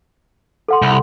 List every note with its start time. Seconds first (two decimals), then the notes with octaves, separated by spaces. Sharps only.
0.68 A4 F#5 C6
0.82 C2